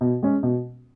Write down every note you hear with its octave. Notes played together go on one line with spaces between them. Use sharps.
B2
G#3 C#4
B2